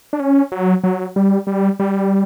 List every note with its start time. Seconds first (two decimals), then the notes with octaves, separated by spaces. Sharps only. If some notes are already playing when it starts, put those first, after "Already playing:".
0.13 D4
0.20 C#4
0.52 F#3
0.84 F#3
1.16 G3
1.47 G3
1.79 G3